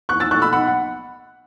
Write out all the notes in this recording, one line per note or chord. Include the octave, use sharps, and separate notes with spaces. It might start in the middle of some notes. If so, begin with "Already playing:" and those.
E2 C#6 F#6
E6 A6
B2 A3 C#6 F#6
B5 E6
B1 F#5 B5
F#5